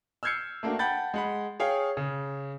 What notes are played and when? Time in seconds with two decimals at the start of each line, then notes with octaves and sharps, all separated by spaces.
0.23 E6 F6 G6 G#6 C7 C#7
0.63 A3 A#3 D4 F#4
0.79 F#5 G5 A5 B5 G6 A6
1.14 G#3 F#5 B5
1.60 G#4 C#5 F5 G5
1.97 C#3